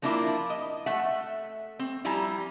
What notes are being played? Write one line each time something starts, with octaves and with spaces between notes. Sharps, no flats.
F3 A#3 D4 E4 F4 A#4
D#5
A3 E5 F#5
C4
F3 G3 E4 G#5 A#5